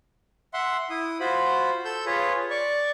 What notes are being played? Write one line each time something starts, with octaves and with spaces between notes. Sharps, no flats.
E5 F#5 C6
E4 D#6
F4 F#4 C5 B5
A4 E6 G6
F4 G#4 B4 C#5
D5 C#6